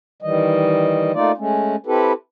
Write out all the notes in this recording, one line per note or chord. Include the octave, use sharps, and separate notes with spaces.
D#3 E3 G3 D#5
A3 A#3 D#4 F4 D5
G#3 A3 C#4
C4 E4 G4 A4 B4